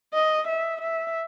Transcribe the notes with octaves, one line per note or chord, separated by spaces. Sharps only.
D#5
E5
E5